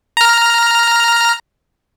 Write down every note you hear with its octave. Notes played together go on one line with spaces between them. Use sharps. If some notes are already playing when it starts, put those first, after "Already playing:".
A#5 F6